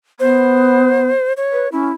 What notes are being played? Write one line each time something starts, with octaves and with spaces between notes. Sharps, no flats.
B3 C5
C#5
B4
C#4 E4